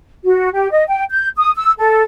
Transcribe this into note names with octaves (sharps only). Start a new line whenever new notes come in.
F#4
G4
D#5
G5
G6
D#6
E6
A4